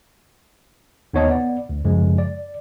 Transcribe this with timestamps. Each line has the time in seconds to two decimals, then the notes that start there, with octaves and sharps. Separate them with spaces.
1.14 D#2 B3 D#4 C#5 D#5 A5
1.28 B3 D5
1.69 D2
1.85 F#2 C#3 F3 G#3
2.18 D5